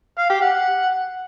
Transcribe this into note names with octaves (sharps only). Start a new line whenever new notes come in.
F5
G4
F#5